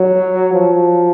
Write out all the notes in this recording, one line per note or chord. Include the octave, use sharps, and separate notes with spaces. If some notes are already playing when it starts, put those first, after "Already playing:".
Already playing: F#3
F3